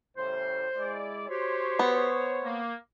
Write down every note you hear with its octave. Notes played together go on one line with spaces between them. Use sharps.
A2 C#3 G3 C5
G#3 E4 D5
F#4 G4 C5 C#5 C6
B3
A#3